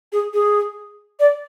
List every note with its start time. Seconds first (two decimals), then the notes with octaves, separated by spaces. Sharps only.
0.12 G#4
0.34 G#4
1.20 D5